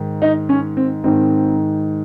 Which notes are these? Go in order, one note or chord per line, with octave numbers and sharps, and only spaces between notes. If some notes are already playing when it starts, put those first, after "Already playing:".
Already playing: G#2 D#3
D#4
C#4
C4
G#2 D#3 C4